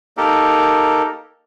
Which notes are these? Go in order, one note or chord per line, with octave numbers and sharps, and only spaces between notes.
A#3 D#4 G4 A4 A#4